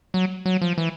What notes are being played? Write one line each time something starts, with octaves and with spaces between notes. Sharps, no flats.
F#3
F#3
F3
E3